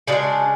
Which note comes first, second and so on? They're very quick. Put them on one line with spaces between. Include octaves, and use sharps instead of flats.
C#3 F3 D4 G#3